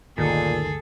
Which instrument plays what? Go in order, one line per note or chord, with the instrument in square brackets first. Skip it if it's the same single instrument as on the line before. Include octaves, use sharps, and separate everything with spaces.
[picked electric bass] G1 D2 [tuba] A#2 [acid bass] D#3 [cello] G#4 A4